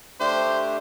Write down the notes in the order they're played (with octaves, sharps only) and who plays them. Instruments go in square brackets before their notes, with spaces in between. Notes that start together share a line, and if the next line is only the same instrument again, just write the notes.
[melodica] A3 D4 G4 [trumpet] C5